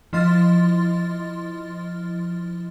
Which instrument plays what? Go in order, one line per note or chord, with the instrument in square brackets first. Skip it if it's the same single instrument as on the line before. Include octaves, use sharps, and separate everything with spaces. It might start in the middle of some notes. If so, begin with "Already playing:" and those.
[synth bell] F3 E4 D#5 C6 F6 A6